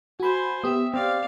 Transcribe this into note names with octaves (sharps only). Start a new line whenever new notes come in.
F#4 C5 G#5 B5
B3 G4 E5 D#6
C4 D5 F5